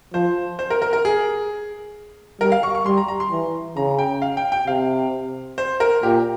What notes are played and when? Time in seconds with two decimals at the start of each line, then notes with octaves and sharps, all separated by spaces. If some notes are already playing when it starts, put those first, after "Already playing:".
0.14 F3 C5
0.59 C5
0.70 A#4
0.82 A#4
0.93 A#4
1.05 G#4
2.40 G3 A#4
2.52 F5
2.63 C#6
2.75 C#6
2.86 G3 C6
2.97 A#5
3.08 A#5
3.20 C6
3.31 E3
3.77 C#3 A#5
3.99 G5
4.22 F5
4.37 G5
4.52 G5
4.67 C3 F5
5.58 C5
5.80 A#4
6.03 A#2 G4